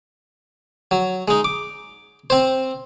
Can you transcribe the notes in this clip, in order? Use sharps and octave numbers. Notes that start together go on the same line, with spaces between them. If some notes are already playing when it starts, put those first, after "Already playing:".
F#3
G#3 D#4
D6
C4 C5